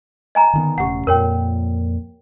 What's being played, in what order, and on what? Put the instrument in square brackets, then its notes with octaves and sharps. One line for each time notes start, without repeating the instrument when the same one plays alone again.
[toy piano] D#5 G#5 A#5
[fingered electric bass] D3 D#3 B3
[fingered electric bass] E1 A2 C#3 [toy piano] G4 F#5
[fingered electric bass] F2 A#2 [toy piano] A#4 C#5 G5